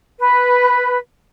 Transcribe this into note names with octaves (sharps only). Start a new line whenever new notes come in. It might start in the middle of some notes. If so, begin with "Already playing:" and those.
B4